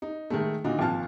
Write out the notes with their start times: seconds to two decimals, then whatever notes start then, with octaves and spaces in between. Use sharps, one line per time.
0.02 D#4
0.30 D#3 G#3 A3
0.64 A#2 D3 D#4 F#4
0.79 G#1 A#2 F3 A5 F6